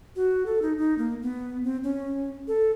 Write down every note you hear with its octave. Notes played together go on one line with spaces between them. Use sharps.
F#4
A4
D#4
D#4
A#3
B3
C4
C#4
A4